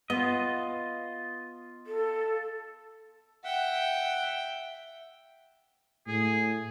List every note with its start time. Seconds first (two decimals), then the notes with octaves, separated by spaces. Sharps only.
0.10 B3 F4 D#5
1.87 A4
3.44 E5 F#5 G5
6.07 A2 G#4